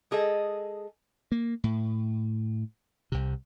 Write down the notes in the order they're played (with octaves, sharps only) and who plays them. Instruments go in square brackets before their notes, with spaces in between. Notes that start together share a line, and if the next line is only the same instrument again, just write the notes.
[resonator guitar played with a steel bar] G#3 G#4 A4 D#5
[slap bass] A#3
A2
C2 C3